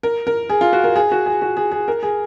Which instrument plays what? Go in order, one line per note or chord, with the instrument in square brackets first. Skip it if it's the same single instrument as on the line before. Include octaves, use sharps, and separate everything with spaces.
[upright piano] A#4
A#4
G#4
F4
F#4
A#4
G#4
F#4
G#4
F#4
G#4
G#4
A#4
G#4